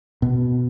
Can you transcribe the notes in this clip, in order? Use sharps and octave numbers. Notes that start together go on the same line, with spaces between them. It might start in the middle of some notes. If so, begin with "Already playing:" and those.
B2